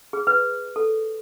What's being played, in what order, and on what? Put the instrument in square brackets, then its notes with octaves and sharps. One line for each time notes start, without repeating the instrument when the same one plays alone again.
[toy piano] G#4
B4
A4